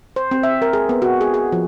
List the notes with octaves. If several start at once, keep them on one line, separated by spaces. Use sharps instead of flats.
C5
C4
E5
A#4
G#4
B3
F#4
G#4
G#4
F3